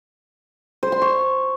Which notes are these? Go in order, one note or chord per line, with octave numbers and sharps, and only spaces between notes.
C5
C6
C#6